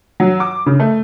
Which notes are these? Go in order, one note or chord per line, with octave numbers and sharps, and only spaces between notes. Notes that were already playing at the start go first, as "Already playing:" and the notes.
F#3
D6
C#3
A3